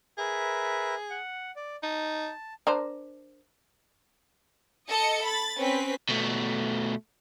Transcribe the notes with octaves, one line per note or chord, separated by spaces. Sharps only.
G#4 A#4 B4 E5
F#5
D5
D#4 A5
D4 A#4 C5
A4 D#5 C#7
B5 A6
C4 C#4 B4 B6
B2 A3